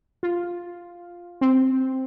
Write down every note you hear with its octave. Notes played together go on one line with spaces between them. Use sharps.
F4
C4